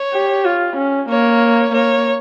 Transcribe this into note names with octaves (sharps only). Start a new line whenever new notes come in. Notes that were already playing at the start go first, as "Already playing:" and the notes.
Already playing: C#5
G4
F4
C#4
A#3 C#5
A#3 C#5